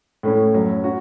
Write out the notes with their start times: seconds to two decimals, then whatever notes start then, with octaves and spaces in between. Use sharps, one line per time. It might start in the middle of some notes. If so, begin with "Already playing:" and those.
0.23 A2 A3 C#4 E4
0.54 F#2 F#3 C#4
0.84 C#4 F#4